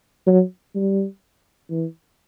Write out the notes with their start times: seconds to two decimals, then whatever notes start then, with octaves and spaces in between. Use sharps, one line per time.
0.26 F#3
0.75 G3
1.70 E3